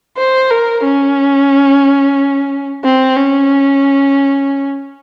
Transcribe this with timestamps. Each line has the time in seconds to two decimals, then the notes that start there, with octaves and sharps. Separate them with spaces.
0.18 C5
0.51 A#4
0.84 C#4
2.84 C4
3.17 C#4